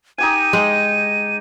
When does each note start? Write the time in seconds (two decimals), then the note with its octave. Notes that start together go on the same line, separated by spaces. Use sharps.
0.18 D#4 G4 G#5 D#7
0.53 G#3